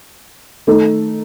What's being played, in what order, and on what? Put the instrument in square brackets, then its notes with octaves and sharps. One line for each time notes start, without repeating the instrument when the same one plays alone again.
[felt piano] D#3 A3 D#4 A4